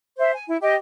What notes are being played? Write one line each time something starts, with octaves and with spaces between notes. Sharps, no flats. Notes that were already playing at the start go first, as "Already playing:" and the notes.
C5 E5
G#5
E4
G4 D#5